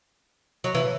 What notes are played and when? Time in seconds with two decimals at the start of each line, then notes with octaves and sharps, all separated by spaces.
0.64 F#3
0.75 E3